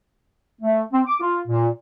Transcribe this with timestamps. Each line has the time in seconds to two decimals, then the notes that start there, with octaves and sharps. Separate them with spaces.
0.61 A3
0.92 C4
1.05 D6
1.20 F4
1.48 A#2